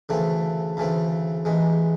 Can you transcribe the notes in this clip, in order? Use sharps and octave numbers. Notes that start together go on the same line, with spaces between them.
D2 C#3 E3 A3 C4
D2 C#3 E3 A3 C4
A1 G#2 E3 G#3